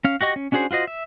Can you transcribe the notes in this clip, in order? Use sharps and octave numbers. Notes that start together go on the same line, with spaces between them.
C#4 F5
F#4 G4 D#5 C#6
C#4
C#4 D4 F#4 G#4 C5
F4 F#4 C5 D#5
E5